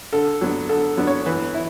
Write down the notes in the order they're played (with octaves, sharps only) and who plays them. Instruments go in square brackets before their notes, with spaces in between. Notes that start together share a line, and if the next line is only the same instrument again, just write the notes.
[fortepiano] D3 [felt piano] A4
[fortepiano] F#3 B3 D4
[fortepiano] D3 [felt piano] A4
[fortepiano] F#3 B3 D4
[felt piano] C#5
[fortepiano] E3 [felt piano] B4
[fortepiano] E4